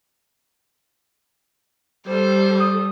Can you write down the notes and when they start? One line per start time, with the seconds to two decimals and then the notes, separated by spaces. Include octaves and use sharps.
2.06 G3 A4 C5
2.60 D#6